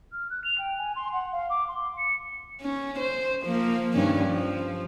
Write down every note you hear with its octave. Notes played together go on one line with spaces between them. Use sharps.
F6
F#6
F7
G5
G#5
C6
F#5
F5
D6
C6
C#7
C#4
C5
F3 A#3
G2 D#3 C#4
F3